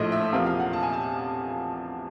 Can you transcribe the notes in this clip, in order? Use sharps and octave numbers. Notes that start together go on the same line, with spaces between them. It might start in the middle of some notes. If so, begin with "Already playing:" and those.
Already playing: A#1 A2 F3 A3 C5 D#5
E5
E2 C3 F3 A#3 F5
F5
F#5
A5
G#5
A5